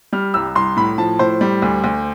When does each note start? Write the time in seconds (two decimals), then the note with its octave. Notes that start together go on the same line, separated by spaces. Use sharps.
0.13 G3 F6
0.34 C2 E6
0.55 C2 C6
0.77 A2 B5
0.98 F3 A5
1.19 A2 C5
1.41 G3
1.62 D2
1.84 D2